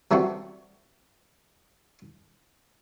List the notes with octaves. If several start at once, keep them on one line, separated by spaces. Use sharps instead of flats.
E3 G3 A3 C4 F#4